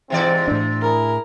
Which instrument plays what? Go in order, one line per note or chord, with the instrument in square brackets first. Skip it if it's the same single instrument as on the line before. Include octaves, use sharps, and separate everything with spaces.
[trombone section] G#2 C4 [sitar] C3 E3 D5
[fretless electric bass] A2 D4
[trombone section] E4 G#4 [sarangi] A#4